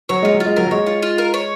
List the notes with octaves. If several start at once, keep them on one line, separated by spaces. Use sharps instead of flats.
F#3 C#5
G#3 F4
F#3
F4
G#3
F#3 A#4
F#3
G#3 C#5
F4
F4
A#4
C#5